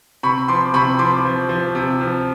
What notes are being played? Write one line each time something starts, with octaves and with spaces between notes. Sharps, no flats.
C3 B5 C#6
F3 C6 D6
C3 B5 C#6
F3 C6 D6
F3
F3
C3
F3